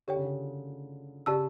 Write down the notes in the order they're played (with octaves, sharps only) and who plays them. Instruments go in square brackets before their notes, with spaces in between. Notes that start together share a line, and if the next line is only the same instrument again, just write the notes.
[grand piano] D3 [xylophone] G4 C#5 G5
[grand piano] C#3
D3
[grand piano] C#3 [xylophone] G4 D5 A5 E6